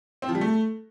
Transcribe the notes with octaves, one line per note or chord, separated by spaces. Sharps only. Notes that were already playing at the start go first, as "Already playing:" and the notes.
C4
F3
G3
A3